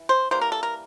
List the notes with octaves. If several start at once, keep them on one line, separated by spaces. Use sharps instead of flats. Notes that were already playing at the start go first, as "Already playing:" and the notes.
Already playing: E3
C5
E3 G3 A#3 C5
A#4
A4
A#4